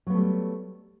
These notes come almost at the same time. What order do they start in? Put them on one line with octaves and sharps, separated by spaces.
F#3 B3 A3 G3